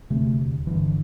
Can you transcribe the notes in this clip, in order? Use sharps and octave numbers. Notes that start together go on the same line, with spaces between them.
E1 D2 C3 A3
G1 G2 D3 E3